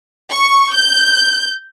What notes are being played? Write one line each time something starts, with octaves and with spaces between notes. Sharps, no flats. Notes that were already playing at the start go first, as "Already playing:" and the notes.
C#6
G6